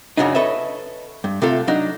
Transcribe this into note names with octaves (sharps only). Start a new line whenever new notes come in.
F#2 A#2 C#3 F#3 D4 D#4
A4 B4 C#5 D#5 E5
G2
C3 A3 F4 A4 A#4
F#3 D4 D#4